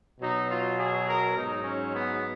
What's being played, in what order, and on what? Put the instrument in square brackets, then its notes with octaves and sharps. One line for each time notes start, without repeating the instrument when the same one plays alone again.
[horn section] B2 F#3 D#4
F4
G#4
A#4
G#2 F#3 D#4
C#4
B3